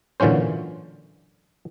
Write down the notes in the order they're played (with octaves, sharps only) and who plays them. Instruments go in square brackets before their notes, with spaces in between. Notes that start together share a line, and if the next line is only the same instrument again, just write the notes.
[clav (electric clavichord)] A#2 D3 E3 F#3 C#4 C5